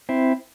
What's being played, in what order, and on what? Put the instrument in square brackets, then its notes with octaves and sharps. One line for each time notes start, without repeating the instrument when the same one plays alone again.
[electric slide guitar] C4 E4